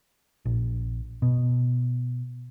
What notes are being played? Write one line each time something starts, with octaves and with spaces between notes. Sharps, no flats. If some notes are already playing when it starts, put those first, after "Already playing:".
A#1
B2